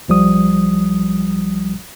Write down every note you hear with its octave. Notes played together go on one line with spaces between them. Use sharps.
B1 F3 G3 D#6